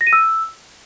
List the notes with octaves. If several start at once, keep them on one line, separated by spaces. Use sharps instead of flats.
A#6
D#7
E6